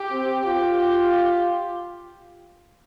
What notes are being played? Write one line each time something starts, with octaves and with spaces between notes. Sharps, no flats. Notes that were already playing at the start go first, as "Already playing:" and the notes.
Already playing: G4
C4
F4 G4
G4
G4